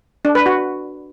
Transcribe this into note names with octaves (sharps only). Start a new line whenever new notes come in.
D4
B4
F#4